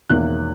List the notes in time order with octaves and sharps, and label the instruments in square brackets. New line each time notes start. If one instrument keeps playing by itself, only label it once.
[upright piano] E1 E2 D#3 A#3 E4 F#6